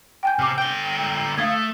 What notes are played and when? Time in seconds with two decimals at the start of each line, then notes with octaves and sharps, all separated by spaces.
0.23 G5 G#5 G6
0.39 C3 D6 F6
0.58 D3 G5 G6 G7
1.38 A3 F5 D#6 G#6